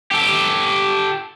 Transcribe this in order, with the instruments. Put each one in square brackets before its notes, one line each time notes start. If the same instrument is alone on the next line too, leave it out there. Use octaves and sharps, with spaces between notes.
[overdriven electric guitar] G4 A4